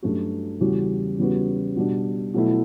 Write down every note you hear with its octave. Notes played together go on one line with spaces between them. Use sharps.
G2 F#3 A3 C#4 F#4
E2 C#3 G3 C#4 F#4
E2 C#3 G3 B3 F#4
B2 G3 D4
B2 F#3 A3 E4